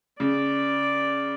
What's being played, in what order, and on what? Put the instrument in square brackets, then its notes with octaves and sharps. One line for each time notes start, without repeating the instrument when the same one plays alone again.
[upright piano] C#3 [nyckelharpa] D5